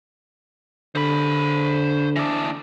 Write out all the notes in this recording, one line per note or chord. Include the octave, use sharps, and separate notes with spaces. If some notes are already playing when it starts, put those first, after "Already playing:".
D3 C5 B5
E3 D4